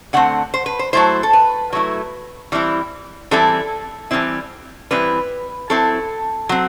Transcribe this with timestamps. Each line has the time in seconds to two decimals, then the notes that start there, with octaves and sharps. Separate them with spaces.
0.13 D3 A3 C4 F#5
0.54 C5
0.66 B4
0.79 C5
0.93 F#3 A3 E4 C5
1.23 A4
1.33 B4
1.73 F#3 A3 E4
2.52 E3 G3 C4 E4
3.31 E3 G3 C4 E4 A4
4.11 E3 G3 C4 E4
4.91 E3 G3 C4 E4 B4
5.70 F#3 C4 E4 A4
6.49 F#3 C4